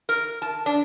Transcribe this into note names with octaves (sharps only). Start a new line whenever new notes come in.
A#4
A5
D4